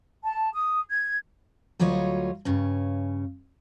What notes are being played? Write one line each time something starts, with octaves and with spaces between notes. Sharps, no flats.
A5
D#6
G#6
D2 F#3 G3 F4 C#5 D#5
G2 C#3 C#4